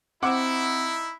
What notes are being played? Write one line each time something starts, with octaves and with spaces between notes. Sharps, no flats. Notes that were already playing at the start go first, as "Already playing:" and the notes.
C4 D#4 E4 F#5 D6